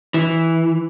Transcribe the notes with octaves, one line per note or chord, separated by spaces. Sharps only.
E3